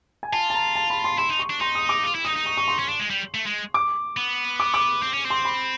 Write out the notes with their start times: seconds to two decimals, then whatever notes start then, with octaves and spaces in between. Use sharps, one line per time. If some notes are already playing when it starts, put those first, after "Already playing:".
0.23 G#5
0.33 F4 A5
0.50 A5
0.55 A#5
0.75 A5
0.90 B5
1.04 C6
1.18 E4 C6
1.29 D#4
1.39 C#6
1.50 D4
1.61 D#4 C6
1.75 D#6
1.89 D6
2.04 F4
2.15 E4
2.25 D#4 D#6
2.36 D#4
2.46 C#6
2.57 C#6
2.68 C6
2.79 C#4
2.89 D4
3.00 G#3
3.10 G3
3.34 A3
3.46 G#3
3.74 D6
4.17 B3
4.60 D6
4.74 D6
5.03 C4
5.14 C#4
5.25 C4
5.30 C6
5.45 B5